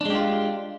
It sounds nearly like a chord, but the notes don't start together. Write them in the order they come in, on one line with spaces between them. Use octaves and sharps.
D4 G#3 G4 F4